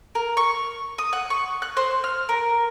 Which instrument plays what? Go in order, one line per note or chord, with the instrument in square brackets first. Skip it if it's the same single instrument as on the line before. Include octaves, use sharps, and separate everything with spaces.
[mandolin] A#4
C#6
D#6
F#5
C#6
F#6
C5
F6
A#4